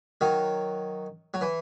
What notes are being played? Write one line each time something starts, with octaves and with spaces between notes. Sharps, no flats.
D#3 F#3
F#3
E3